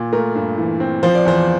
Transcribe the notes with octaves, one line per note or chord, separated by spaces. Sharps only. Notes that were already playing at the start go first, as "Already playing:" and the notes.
Already playing: A#2
A3 A#4
G2
E3
C4
F3 C5
D5
E2 C5